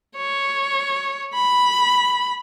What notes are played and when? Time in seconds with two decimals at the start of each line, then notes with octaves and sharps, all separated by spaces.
0.17 C#5
1.34 B5